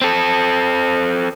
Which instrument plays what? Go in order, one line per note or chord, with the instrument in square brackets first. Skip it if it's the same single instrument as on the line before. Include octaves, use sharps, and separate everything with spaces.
[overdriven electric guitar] C4 A4